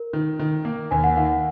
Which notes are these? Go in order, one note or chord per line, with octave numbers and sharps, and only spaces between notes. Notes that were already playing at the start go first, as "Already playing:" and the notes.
Already playing: A#4
D#3
D#3
A#3
D#2 G#5
F#5
D#3 F5